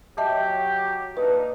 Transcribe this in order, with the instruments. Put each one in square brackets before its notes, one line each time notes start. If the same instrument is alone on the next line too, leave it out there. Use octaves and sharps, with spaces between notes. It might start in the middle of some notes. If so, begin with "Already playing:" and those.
[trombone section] F#3 G4 [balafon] D#5 E5 A5
[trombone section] A#2 D4 D#4 [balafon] B4